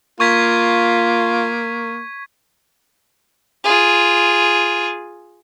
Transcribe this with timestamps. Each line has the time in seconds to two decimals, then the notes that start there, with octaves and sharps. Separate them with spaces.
0.20 A#3 F4 C#6 G#6 B6
3.64 F4 G#4